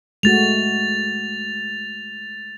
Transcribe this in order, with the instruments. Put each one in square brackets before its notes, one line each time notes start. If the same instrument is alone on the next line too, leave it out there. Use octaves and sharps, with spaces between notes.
[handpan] G#3 A3 F#4 [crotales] A6 F7